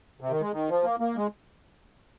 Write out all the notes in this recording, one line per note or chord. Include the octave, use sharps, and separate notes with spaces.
C3
D#3
G#3
D#3
F3
A#3
A#3
G#3